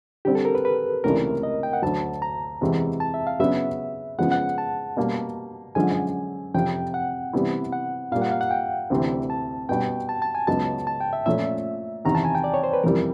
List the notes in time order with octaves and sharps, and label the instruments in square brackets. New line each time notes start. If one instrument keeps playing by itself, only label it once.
[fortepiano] D3 G3 C4 [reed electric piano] G4
[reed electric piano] A4
A#4
B4
B4
[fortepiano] C#2 C3 E3 A3 D4 [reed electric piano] A#4
[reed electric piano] D#5
G5
F#5
[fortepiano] D2 D3 F#3 [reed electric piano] A5
[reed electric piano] A#5
[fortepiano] E2 C3 E3 G#3
[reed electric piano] A5
E5
F5
[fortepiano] C#3 F#3 B3 D4 [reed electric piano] E5
[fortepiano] C#3 F3 G#3 B3 [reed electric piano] F#5
[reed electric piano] F#5
A5
[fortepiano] B2 G3 A#3
[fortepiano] F#2 D3 F3 G#3 [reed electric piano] G#5
[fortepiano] F2 C3 F3 [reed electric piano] G5
[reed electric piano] F#5
[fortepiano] C3 E3 G3 B3 E4
[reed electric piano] F#5
[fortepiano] A#2 G3 A#3 [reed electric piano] F5
[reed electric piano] F#5
F5
F#5
G5
[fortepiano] D2 C3 E3
[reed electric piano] A5
[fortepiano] B2 G3 B3 [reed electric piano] G5
[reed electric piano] A5
A5
G#5
[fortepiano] C#2 C#3 F#3 B3 D#4 [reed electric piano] A5
[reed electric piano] A5
G5
E5
[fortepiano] A#2 F3 A3 C#4 [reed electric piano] E5
[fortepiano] E2 C3 D#3 [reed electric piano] A#5
[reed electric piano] A5
G#5
G5
D5
C#5
C5
B4
[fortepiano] F2 C3 E3 G3 C4 [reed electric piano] A#4